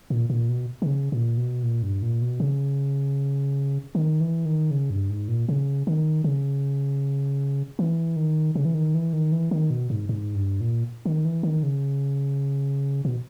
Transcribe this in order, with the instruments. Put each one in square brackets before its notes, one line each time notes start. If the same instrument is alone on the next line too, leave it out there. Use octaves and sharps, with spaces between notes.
[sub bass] A#2
A#2
B2
D#3
C#3
A#2
B2
A#2
G2
A#2
B2
C#3
D#3
E3
D#3
C#3
G2
G#2
A#2
C#3
D#3
C#3
E3
D#3
C#3
E3
D#3
E3
D#3
E3
D#3
B2
G#2
G#2
G2
A#2
D#3
E3
D#3
C#3
B2